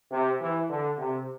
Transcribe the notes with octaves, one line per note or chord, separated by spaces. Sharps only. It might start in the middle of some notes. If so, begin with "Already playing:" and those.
C3
E3
D3
C3